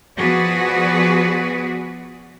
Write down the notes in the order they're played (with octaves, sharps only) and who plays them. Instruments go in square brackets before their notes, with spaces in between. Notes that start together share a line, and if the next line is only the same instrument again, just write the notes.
[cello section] F3 B3 F#4 G#4 B4 D5